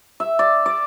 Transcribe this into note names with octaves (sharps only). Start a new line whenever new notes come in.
E5
D5
D5